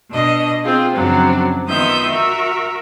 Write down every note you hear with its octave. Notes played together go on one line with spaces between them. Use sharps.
B2 D4 D#5
C4 F4 G#4
F#2 C#3 F3 F#3 C4 D4
D#3 B3 F4 E5 D#6 G6
F#4 A#4 E5